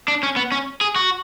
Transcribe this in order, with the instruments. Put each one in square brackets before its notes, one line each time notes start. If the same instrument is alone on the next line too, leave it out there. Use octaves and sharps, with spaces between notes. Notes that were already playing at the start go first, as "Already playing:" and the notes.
[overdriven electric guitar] D4
C#4
B3
C#4
G#4
F#4